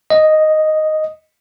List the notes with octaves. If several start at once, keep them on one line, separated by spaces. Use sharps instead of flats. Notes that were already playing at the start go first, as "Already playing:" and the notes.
D#5